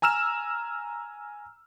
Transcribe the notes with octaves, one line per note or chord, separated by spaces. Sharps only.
G#5 A#5 E6 F6 E7